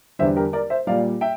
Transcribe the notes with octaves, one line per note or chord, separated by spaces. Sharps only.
E2 D3 G3 C5 E5
G4 A#4
A#4 D5
C5 E5
A#2 G3 D5 F5
E5 G5